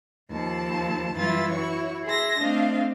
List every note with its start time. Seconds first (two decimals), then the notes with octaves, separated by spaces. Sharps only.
0.30 D#2 F3 A5
1.16 F#2 E3 G3 E4 F4 A6
1.50 E4 F#4 C#5 C#6
2.05 G#4 E5 C6 A#6
2.40 A3 C4 D4 D#5 F5